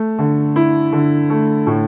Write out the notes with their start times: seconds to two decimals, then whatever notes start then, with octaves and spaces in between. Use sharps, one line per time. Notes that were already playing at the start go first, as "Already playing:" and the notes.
Already playing: A3
0.19 D3
0.56 E4
0.93 D3
1.30 A3
1.67 A2